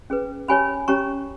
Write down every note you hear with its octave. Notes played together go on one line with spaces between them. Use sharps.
C#4 G#4 B4
C#4 G4 C#5 G#5 B5
C#4 G4 C#5 A#5 C#6